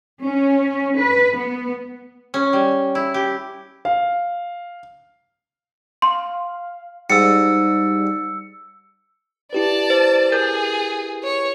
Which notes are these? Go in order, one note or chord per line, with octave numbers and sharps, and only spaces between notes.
C#4
B4
B3
C#4
G3
E4
G4
F5
F5 C6
G#2 G3 E6 C#7
E4 G4 B4 D5 A5
C5
G#4 A#4 G6 A6
C#5